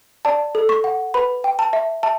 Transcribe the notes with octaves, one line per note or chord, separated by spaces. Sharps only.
D5 A5
A4
C#6
F#5
B4 B5
G5
A5
E5
E5 A5